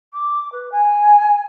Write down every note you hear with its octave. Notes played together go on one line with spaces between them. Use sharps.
D6
B4
G#5